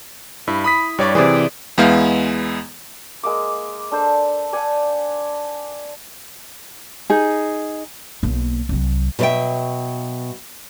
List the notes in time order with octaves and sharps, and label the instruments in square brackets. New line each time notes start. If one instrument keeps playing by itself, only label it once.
[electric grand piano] G2 [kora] E4
[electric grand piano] B5 D#6 B6
[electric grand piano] G2 C#5 D5 [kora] G3
[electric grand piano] C3 E3 [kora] G#4 C5 D5
[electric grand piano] E2 G#3 B3 E4 F5 G6
[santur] G#3 A#3 D6
D4 A4 C5
D5 F#5 G#5 A5
[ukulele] D#4 G#4
[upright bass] B1 A#3
C2 F#3
[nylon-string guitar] B2 F#3 A4 B4 E5 G5